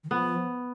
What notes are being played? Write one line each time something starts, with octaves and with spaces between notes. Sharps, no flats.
D#3
F3 B3